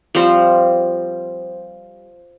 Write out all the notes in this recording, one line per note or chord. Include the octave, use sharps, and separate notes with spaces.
F3 G3 C4 C5